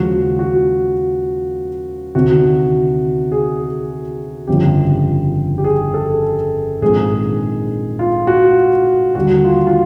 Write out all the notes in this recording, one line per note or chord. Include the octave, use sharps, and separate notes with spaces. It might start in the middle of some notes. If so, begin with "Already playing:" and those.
Already playing: D#2 C#3 F3 G#3 F#4
F#4
D2 C3 D#3 F#4
G#4
G1 F2 C#3 F3 G4
G4
G#4
A4
A#1 G#2 D#3 G#3 C4 G#4
F4
F#4
D#2 D3 G3 F#4
F4
F4